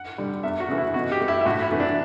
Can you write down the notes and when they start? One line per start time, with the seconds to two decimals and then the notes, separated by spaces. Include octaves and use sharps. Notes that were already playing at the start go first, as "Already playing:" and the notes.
Already playing: F#5
0.18 D3 G3
0.43 E2 E5
0.60 F#4
0.69 C#3 E3 A3
0.78 E4
0.94 B2 F#4
1.12 G4
1.21 A3
1.28 E4
1.41 E4
1.45 A2 F#4
1.62 E4
1.71 E3 A3
1.80 D4